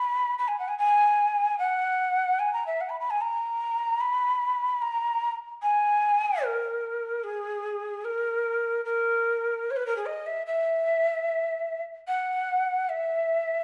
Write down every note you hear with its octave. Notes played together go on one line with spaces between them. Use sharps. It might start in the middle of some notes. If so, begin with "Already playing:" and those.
Already playing: B5
B5
G#5
F#5
G#5
G#5
F#5
G#5
A#5
E5
F#5
B5
B5
G#5
A#5
B5
A#5
G#5
A#4
G#4
A#4
A#4
C#5
B4
A#4
G#4
D#5
E5
E5
F#5
E5